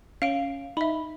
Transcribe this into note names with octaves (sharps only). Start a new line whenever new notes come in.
C#4 F5 D7
D#4 E5 B5